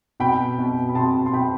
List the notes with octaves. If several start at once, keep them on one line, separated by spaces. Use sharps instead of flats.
B2 G5 B5
B2
B5
B2 A5 C6
C6
B2 G5 B5